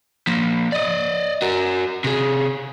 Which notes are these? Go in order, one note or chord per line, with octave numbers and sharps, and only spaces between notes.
F3 A#3
D5 D#5
F#4 A#4
C3 G#4